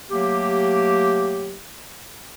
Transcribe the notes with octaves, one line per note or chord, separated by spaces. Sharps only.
F#3 A3 A#3 G4